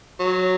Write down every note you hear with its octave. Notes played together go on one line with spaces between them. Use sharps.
F#3